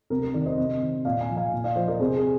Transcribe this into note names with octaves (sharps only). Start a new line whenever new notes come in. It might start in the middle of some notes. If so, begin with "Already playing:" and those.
C3 A#4
A#4
D#3 A#4 D5
C5 D#5
C3
D#3
A#2 D5 F5
F5 G#5
F3
F5 G#5
A#2
D5 F5
F3 C5 D#5
A#4 D5
C3 G#4 C5
G#4